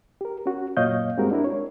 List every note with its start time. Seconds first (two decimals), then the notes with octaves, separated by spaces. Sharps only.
0.21 G4 A#4
0.46 C#4 F#4
0.77 F#2 A#2 C#5 D#5 F5 G6
1.17 G2 G#3 C4 F#4 G4 A#4
1.31 D4 E4 A#4
1.44 C#5